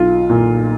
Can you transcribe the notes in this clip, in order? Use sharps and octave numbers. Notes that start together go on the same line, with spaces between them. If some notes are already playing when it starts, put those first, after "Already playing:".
Already playing: B1 F4
A#2